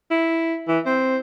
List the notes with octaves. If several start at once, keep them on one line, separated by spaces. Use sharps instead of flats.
E4
E3
C4